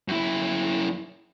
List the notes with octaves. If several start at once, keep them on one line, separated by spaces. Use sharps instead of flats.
F#2 E4